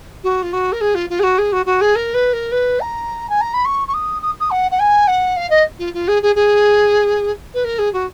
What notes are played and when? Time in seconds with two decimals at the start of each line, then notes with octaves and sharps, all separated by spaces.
0.23 F#4
0.42 F4
0.53 F#4
0.72 A#4
0.81 G#4
0.95 F4
1.10 F4
1.19 G#4
1.23 F#4
1.38 G#4
1.52 F#4
1.66 F#4
1.81 G#4
1.95 A#4
2.14 B4
2.33 A#4
2.52 B4
2.80 A#5
3.29 G#5
3.41 A#5
3.54 B5
3.65 C#6
3.88 C#6
3.94 D#6
4.22 D#6
4.40 D#6
4.50 F#5
4.71 F#5
4.79 G#5
5.07 F#5
5.36 F5
5.50 D#5
5.79 F4
5.94 F4
6.08 G#4
6.22 G#4
6.35 G#4
7.54 B4
7.64 A#4
7.78 G#4
7.93 F#4